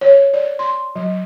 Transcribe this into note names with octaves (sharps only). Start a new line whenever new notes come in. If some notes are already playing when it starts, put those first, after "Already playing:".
C#5
D5
C6
F#3